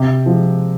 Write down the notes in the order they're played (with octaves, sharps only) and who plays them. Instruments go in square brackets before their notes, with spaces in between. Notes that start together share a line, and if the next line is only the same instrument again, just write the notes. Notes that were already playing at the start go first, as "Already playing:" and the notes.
Already playing: [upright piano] C3
F3 G#3